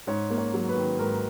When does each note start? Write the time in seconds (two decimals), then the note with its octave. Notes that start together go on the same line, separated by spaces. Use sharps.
0.07 G#2 C#5
0.30 A#3
0.38 C#5
0.54 F#3
0.69 B4
0.76 D#3
0.99 G#2 A#4